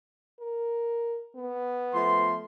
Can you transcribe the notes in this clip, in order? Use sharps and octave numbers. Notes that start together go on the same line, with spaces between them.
A#4
B3
F3 A3 C6